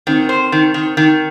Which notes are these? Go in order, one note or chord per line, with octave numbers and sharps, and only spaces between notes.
D#3 C4
C5
D#3
D#3
D#3